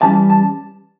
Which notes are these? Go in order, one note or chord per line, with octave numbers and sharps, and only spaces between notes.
E3 G3 C#4 A5
A5